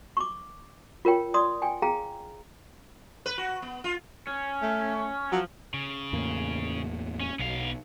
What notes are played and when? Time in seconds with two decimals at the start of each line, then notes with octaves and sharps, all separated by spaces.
0.17 C#6 D6
1.05 F4 A#4 C#5 G5
1.34 D5 C6 D#6
1.62 G5 G#5
1.82 G#4 F5 G5 A#5
3.26 B4
3.38 F#4
3.62 B3
3.84 F4
4.27 C#4
4.62 A3
5.32 F3 F#3
5.74 C#3
6.13 E2 A2 A#3
7.20 C#4
7.39 B1 B3 F5